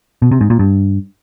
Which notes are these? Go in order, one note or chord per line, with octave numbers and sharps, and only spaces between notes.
B2
C3
G#2
A#2
G2